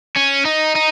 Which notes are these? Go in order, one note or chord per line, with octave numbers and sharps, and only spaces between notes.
C#4
D#4
D#4